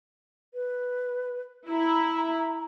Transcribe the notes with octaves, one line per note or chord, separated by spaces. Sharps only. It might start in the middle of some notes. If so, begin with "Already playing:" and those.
B4
E4 A#5